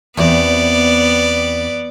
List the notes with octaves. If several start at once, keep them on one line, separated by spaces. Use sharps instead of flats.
E2 B3 C4 G4 D5